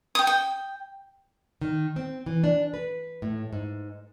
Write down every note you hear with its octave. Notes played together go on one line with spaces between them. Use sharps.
G5 D#6
G5
D#3
C4
E3
D4
B4
A2
G#2